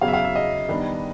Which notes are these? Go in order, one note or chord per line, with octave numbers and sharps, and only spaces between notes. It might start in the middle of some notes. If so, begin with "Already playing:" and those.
E2 C#3 F#3 F5
E5
F5
E5
D#5
D#3 G3 B3 D4